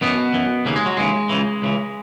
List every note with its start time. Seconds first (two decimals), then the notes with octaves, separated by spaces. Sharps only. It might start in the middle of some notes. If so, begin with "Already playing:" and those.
0.01 F#2 B2 E3 B3
0.33 F#2 E3
0.65 D#2 C#3 E3 A#3
0.76 G#3
0.86 F#3
0.97 D#2 C#3 E3 G#3
1.29 C#2 C#3 E3
1.62 C#2 C#3 E3